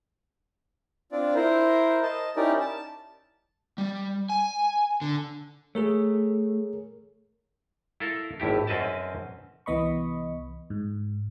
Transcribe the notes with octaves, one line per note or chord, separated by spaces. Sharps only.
C4 D4 F4 D5
E4 A#4 C5
D#5 A5
C#4 D#4 E4 G4 A#4 D5
A5
G3
G#5
D3
A3 G#4 A#4 C#5
E4 F4 A4 A#4
G#1 A2 E4 G4
F#2 C4 C#4 B4 D#5 A5
C2 E3 B3 D#5 B5 C#6
G#2